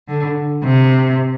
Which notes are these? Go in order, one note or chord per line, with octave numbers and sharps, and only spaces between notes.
D3
C3